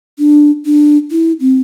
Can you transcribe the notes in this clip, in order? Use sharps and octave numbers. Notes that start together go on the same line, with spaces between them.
D4
D4
E4
C4